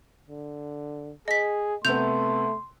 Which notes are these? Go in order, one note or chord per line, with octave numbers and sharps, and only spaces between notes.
D3
G#4 D#5 B6
C3 A3 B3 C6 G6 F7